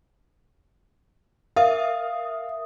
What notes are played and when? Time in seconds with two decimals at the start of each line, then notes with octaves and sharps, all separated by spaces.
1.56 A#4 E5 F5 D#6